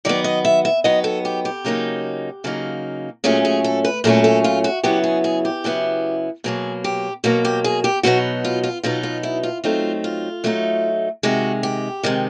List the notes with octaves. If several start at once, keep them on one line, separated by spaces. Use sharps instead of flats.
D#3 F#3 B3 D5
D#5
E5
E5
D#3 F#3 B3 D#5
A4
G4
G4
C#3 F#3 A#3 D#4
C#3 F#3 A#3 D#4
A#2 F#3 A3 C#4 G#4
G#4
A4
B4
A#2 F#3 A3 C#4 A4
A4
F4
F#4
C#3 F#3 B3 E4 G4
G#4
G#4
G4
C#3 F#3 B3 E4
B2 F#3 A#3 G#4
G4
B2 F#3 A#3 F#4
G4
G#4
G4
B2 F#3 B3 D#4 F#4
F4
F4
B2 F#3 B3 D#4 F4
F4
E4
F4
F#3 A3 C4 D#4 F4
F4
F#3 A3 C4 D#4
C3 D#3 G#3 F#4
G4
C3 D#3 G#3